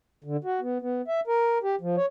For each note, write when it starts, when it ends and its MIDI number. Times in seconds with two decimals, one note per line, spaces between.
0.24 0.37 50
0.44 0.60 66
0.61 0.78 59
0.81 1.02 59
1.08 1.20 76
1.27 1.58 70
1.63 1.75 67
1.81 1.96 53
1.97 2.06 73